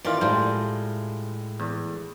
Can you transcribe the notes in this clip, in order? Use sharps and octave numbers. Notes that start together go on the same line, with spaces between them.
D#3 E3 F4 D5
A2 G3 G#3 F4 C5
E2